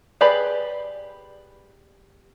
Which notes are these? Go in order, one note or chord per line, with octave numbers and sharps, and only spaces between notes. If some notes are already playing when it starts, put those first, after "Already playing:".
G4 G#4 B4 D5 B5